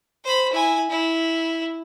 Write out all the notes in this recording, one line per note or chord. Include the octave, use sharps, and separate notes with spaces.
C5 B5
E4 G#5
E4